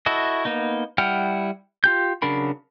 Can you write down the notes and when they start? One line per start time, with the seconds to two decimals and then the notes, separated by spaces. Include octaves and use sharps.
0.06 E4 F#4 A4 D#5
0.45 A#3 B3 D#4
0.98 G3 E4 F#5 G5 F6
1.84 F4 G4 G6
2.22 C#3 F#3 D4 A#4 B5